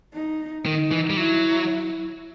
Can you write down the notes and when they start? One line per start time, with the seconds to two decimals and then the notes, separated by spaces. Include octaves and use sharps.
0.14 D#4
0.66 D#3 D#4
0.91 E3
1.10 G3
1.17 F#3 E4